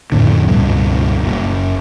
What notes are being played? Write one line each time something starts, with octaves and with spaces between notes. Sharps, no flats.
F2 A2 D3
C#2 G2 B2
F#1